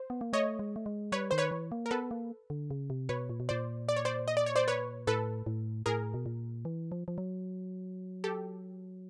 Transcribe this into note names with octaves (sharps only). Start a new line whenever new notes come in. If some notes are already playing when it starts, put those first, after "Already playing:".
Already playing: C5
B3
A#3
A3 C#5 D#5
G#3
A3
G#3
G3 B4 C#5
D#3 C5
B4 C#5
E3
A#3
A#4
B3 A4 B4
A#3
D3
C#3
C3
B2 B4 C#5
A#2
B2
A#2 C5 D5
D5
C#5
C5 D5
D#5
D5
C#5
C5 D5
B4 C#5
A2 A4 B4
A2
A2 G#4 A#4
B2
A#2
E3
F3
F3
F#3
G4 A4